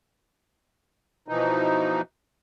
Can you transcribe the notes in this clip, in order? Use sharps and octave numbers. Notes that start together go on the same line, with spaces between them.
B2 E3 F3 D#4